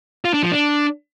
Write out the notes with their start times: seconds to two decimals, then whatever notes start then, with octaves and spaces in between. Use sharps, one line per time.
0.25 F4
0.34 D4
0.43 F3
0.52 D4